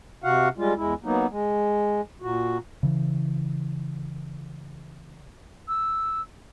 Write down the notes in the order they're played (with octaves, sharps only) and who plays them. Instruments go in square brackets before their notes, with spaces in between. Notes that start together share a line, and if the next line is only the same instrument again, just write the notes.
[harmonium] C3 F#4 F5 F#5
G3 G#3 F4
E2 G#3 E4
F#3 A#3 B3 D#4
G#3
A#2 F#4
[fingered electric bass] C#3 E3
[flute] E6